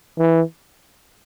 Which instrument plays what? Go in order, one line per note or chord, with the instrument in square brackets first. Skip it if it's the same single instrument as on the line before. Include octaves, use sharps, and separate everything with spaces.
[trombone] E3